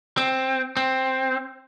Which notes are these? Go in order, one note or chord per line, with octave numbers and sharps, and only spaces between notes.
C4
C4